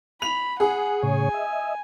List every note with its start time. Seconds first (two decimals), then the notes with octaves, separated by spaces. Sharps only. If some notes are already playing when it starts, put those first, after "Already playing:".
0.22 B5 F7
0.60 G#4 F#5
1.03 A2 C#3 C#5 G#5
1.34 D#5 E5